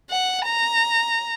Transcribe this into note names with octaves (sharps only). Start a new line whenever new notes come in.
F#5
A#5